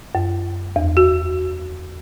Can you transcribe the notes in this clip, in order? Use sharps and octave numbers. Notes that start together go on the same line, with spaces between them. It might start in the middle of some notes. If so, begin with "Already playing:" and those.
F#2
E2
F#4